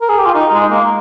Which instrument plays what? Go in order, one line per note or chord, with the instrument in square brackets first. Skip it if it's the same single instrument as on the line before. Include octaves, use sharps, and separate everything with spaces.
[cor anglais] A#4
G#4
G4
F4
D#4
G#3
A#3